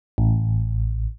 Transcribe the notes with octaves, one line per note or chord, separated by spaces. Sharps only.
A1